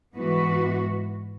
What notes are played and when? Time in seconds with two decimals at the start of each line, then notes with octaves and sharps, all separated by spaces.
0.16 G#2 E3 B3 F#4 B4